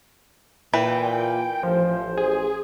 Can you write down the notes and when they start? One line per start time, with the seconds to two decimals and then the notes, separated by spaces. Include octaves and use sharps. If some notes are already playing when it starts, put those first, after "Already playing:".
0.74 A#2 E3 B4 G5
1.63 A1 F3 C5
2.18 G#4